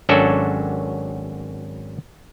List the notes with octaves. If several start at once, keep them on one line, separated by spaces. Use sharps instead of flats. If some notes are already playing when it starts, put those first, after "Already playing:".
G#1 F#3 C#4 D4 F#4 A4